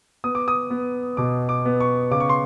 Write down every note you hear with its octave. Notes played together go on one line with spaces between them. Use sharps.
B3 D#6
D6
D#6
B3
B2 D6
D6
B3
C#6
C#3 D6
C#6
C6